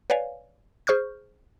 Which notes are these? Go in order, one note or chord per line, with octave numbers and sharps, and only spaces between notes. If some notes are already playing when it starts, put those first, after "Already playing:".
B4 C#5 D5 F5 G#5
G#4 C5 C#6 F6 G6